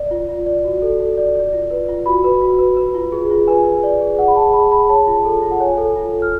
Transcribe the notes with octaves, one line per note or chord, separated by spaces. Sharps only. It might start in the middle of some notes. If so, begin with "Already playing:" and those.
Already playing: D5
F4
F4
D5
F#4
A4
A4
D5
D5
F4
B4
F4
F#4 B5
B4
F#4
B4
B4
F4
G#4
F4
B4 G#5
B4
D5
G#4
G#4 F#5
B5
G#4 A5
G#4 B5
G#4 B5
C#5 A5
F4
A4
F4
F#5
C#5 G#5
A4
F4
A4
F6